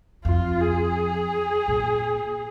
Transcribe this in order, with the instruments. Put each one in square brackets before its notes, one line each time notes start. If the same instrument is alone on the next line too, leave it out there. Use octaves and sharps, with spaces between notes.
[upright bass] F2 [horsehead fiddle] F4
[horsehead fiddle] G#4
[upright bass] A#2